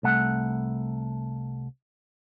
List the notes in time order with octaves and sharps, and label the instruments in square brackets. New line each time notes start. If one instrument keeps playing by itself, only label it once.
[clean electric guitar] C2 A3 F#5